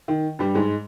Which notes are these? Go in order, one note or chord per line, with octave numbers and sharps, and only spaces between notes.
D#3
G2 G3
G#2 G#3